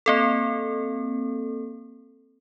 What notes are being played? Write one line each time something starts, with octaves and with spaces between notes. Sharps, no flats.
A#3 C4 A4